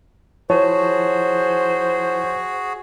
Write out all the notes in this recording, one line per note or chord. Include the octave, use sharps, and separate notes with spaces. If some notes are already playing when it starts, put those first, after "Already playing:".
F3 E4 F#4 G#4 C5 C#5 A5